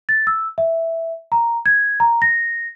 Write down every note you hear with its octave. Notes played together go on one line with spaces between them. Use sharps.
A6
E6
E5
A#5
G#6
A#5
A#6